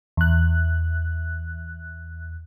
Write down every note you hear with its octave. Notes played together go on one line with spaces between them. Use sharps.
E2 F#6